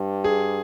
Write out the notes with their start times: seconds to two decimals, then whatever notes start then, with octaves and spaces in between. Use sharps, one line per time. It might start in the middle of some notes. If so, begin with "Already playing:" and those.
Already playing: G2
0.24 G#4